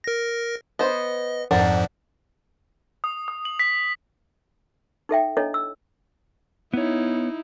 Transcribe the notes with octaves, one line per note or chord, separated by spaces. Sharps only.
A#4 A#6
B3 C5 D#5
F2 G#2 F3 D4 A#4 F#5
D#6
D#6
F#7
B6
D#4 A4 E5 G5
D4 E4 A4 C#5 D#5
E6
B3 D#4 E4 C#5